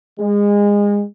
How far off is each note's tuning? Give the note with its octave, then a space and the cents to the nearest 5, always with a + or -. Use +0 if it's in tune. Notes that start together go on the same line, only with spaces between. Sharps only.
G#3 -25